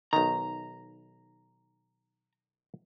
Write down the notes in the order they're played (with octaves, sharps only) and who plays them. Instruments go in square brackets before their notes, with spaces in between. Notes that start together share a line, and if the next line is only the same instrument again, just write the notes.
[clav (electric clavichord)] B1 D#3 [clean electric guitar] A#5